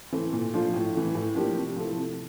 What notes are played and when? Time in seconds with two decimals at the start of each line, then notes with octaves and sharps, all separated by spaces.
0.12 E3 A3 C4 E4
0.33 A#2
0.53 F3 A3 D4 F4
0.74 A2
0.95 E3 A3
1.15 A2
1.35 F3 A#3 D4 G4
1.56 C3
1.76 F3 A3 E4 A4
1.96 C3